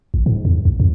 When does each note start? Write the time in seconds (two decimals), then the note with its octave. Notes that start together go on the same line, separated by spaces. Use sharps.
0.14 A1
0.26 G#2
0.45 E2
0.65 C2
0.80 E2